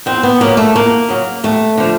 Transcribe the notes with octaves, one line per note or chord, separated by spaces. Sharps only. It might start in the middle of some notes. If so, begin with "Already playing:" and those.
E2 C4
B3
C#3 F#3 A#3
A3
E2 A#3
C#3 F#3
D#2 A3
D3 F3